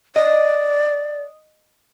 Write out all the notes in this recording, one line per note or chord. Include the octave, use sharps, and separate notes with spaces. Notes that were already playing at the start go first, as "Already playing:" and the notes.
D5 D#5